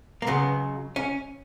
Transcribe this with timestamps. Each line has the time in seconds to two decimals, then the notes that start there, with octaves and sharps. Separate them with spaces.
0.22 A#3
0.27 C#2 C#3 F#3 B3
0.96 C#4